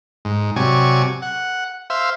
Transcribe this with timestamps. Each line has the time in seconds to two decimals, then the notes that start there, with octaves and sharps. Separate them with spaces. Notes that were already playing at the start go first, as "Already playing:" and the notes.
0.25 G#2
0.56 C3 F#3 D5 G#5 C#6
1.22 F#5
1.90 C5 E5 F5